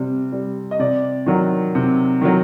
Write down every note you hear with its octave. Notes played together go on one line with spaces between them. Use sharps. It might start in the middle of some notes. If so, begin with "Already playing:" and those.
Already playing: C3 G3
G3
D#5
C3 D5
D#3 F#3
C3
D#3 F#3